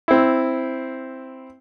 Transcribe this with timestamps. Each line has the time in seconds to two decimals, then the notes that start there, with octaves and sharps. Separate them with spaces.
0.08 C4 E4